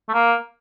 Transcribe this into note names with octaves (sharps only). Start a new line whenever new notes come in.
A3
A#3